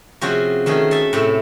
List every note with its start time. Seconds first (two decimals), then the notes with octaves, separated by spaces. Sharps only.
0.21 C3 F3 C#4 F#4 G#4
0.66 D#3 A3 C#4 G#4
0.91 A4 E5 A5
1.13 A2 C3 A3